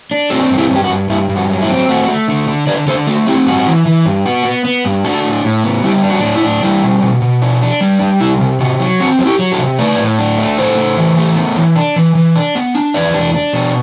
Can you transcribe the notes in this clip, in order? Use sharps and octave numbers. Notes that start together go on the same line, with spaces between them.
D4
C4 F#4 A4
G2
E4 G4
G2
G4
F#4
G2
G2 E4
G2
F#4
F#3
E4
C4
A3 F#4
A3
D3
D3
D3 B4 D5
D3 A4 C5
A3 F#4 A4
C4 E4 G4
G2 F#4
E3
E3
G2
B3 F#4
B3
B3
G2
D4 F#4 A4
A2
A2
B3
G3 E4 G4
D4
F#4
A2
E4
D4
G3 E4
B2
B2
B2
D4
D4
G3
G3
C3 E4
C3
C3 F#4
F#3
C4 F#4
F#3
E4 G4
F#3
F#4 A4
C3
A3 B4 D5
A2
D4
A3
A2 A4 C5
A3
E3
A3
B3
E3
D4
E3
E3
D4
B3
D4
E2 B4 D5
D4
D4
B2